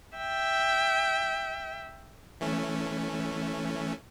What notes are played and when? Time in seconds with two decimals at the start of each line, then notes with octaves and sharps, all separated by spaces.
0.17 E5 G5
2.41 E3 A3 C#4